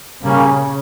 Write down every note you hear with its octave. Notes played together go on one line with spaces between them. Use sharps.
C#3 G3 A#3 C#4